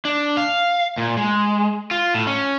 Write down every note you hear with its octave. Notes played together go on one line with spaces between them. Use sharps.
D4
F5
A#2
G#3
F4
A2
C#4